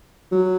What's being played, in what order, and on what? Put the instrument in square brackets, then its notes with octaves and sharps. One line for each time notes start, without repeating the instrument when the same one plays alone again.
[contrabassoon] F#3